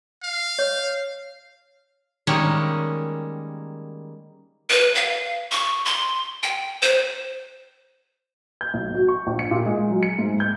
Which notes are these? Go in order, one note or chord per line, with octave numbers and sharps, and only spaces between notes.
F5
C#5
D#3 G3 G#3 A#3 C#4
B4
F5
C#6
C6
G5
C5
G6
B1
F#4
C#6
A#1
C#7
A#2
G#3
F#3
C#7
G#2
G6